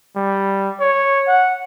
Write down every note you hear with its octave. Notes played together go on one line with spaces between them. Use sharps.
G3
C#5
F#5